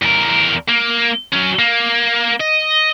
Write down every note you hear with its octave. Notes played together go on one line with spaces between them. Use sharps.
E2 A#4
A#3
F#3 C#4
A#3
D#5